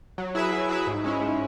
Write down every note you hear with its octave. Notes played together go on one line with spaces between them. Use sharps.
F#3
E4 G#4 B4 E5
F#3
E4 G#4 B4 E5
G#2
G#3 C#4 E4
G#2